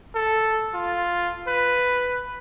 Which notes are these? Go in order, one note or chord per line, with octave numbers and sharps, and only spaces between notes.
A4
F4
B4